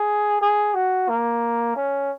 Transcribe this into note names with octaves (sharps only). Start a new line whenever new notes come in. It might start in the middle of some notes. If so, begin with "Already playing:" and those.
Already playing: G#4
G#4
F#4
A#3
C#4